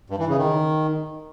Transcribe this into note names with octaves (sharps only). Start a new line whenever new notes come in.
G2
E3
C#3
D#3